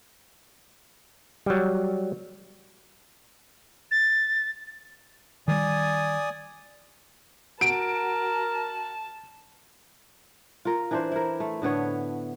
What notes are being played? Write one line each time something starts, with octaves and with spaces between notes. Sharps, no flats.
F#3 G3
A6
D#3 G3 D5 G#5 D#6
F#4 A#4 A5 D7
F4 A#4
E3 D4 C5
E4 A#4
A3
A2 D3 B3 C#5